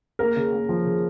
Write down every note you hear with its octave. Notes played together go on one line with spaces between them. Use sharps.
A#3 A#4
C#3
A#3
F3
C#3